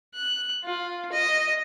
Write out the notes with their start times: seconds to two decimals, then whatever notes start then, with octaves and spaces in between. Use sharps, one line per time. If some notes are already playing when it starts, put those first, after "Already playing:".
0.15 F#6
0.65 F4
1.12 D#5